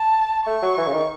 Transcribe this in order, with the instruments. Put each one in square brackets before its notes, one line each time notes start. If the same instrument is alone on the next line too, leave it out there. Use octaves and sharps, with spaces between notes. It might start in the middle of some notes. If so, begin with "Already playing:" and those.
Already playing: [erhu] A5
[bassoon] A3 [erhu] C#6
[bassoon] F#3
E3
C#3
D#3